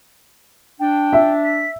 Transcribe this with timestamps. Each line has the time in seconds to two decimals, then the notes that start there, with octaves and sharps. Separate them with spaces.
0.80 D4 G5
1.13 E5
1.45 B6